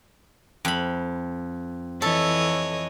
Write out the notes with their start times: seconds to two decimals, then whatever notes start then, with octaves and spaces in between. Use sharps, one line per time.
0.65 F2 B5
2.02 E3 A4 C#5 D#5